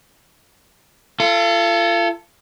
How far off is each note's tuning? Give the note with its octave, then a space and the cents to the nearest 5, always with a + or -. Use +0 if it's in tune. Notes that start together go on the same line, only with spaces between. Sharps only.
F4 -35 A4 +15